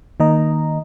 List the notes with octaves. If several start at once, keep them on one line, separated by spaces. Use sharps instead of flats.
D#3 A#3 D#5 A#5